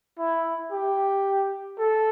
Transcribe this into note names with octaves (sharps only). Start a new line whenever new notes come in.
E4
G4
A4